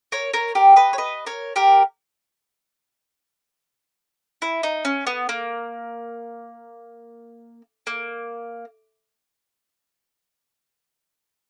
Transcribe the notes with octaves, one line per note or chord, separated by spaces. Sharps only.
A#4 C#5
A#4 C#5
G4 A#4
B4 D#5
C#5
B4 D#5
A#4 C#5
G4 A#4
E4
D#4
C#4
B3
A#3
A#3